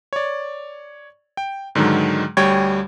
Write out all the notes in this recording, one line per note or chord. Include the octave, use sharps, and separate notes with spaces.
C#5 D5
G5
G#2 D3 D#3 F#3 G#3
D2 G3 C#5 G5 G#6